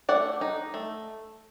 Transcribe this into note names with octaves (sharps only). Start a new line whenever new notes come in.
A3 D5 F#5
D#4
A3